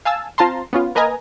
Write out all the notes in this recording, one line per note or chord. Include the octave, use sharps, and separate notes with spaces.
F5 G#5 A5 E6
C4 F4 C5 A5 A#5 C6
B3 C#4 F4
A#3 A#4 B4 D#5 G#5 A#5